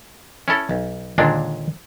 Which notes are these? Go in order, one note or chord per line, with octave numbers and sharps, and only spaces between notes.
C#4 E4 A4
B1
D#2 A#2 D3 G#3 D4